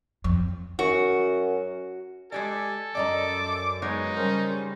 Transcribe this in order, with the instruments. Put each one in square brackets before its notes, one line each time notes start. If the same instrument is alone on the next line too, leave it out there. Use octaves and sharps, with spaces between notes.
[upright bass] F2
[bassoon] F#2 [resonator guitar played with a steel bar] F#4
[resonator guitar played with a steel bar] G#3 G4 D5 [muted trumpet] A4 [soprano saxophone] G#5
[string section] F#2 [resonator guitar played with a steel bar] D5 D#5 A#5 [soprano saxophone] D6
[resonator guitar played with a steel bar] G#3 B3 C#5 [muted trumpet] D#4
[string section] C#3 G3 C#4 [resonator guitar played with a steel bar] A#4 [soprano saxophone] C5